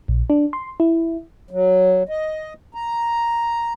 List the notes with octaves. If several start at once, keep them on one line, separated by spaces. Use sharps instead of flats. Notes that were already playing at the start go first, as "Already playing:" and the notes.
A#1
D4
C6
E4
F#3
D#5
A#5